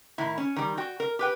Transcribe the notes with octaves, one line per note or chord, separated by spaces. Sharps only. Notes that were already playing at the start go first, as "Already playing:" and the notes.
A2 D#3 E4
C#4
D#3 G3
F#4 G5
A#4
G4 B4 G5